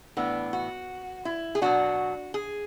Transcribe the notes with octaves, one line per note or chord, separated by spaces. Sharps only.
A2 E3 B3 D4
F#4
E4
G#4
B2 F#3 B3 D4 F#4
G#4